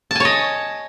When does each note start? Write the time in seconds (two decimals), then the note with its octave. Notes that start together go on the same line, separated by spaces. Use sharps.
0.11 A5
0.15 G#5
0.20 C#5
0.25 D#5